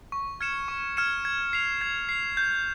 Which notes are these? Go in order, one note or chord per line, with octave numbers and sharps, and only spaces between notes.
C#6
F6 G#6 C#7 E7
C#6
F6 G#6 C#7 E7
G#6
C7 F7
G#6
C7 F7
G6